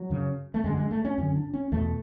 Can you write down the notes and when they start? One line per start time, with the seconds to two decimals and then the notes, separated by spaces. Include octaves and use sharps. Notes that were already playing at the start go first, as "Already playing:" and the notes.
Already playing: F#3
0.10 F#2 C#3
0.54 A3
0.64 F#2 D3 G#3
0.77 G#3
0.91 A3
1.05 C#4
1.18 F#2 D3 C#4
1.36 D4
1.54 C#4
1.72 E2 B2 A3